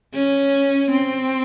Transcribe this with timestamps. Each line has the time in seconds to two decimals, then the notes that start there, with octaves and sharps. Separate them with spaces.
0.14 C#4
0.91 C4